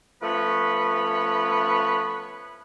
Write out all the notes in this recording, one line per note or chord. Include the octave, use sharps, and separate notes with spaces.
F3 A3 B3 C#4 B4